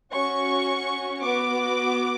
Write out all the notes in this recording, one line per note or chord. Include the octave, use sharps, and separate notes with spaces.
C#4 F#4 C#6
B3 F#4 D6